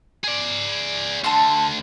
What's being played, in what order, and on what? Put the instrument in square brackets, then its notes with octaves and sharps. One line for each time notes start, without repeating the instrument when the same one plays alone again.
[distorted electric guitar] G#4 D5
[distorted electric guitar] D2 D3 [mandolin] A5 C6